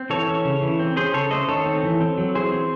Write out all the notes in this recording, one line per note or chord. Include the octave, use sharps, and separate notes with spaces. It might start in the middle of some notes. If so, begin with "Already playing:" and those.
Already playing: C4
E3 A4 C#5
C#4
C#3
E3
C4
C#4 G#4 C5
C#3 A4 C#5
A3 C5 D#5
D#3 A4 C#5
C4
E3
C4
F#3
E3 G#4 C5
C4